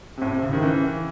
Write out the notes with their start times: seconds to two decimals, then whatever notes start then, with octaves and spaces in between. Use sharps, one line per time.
0.17 C3
0.22 A2
0.32 C3
0.42 C#3
0.53 D#3
0.63 E3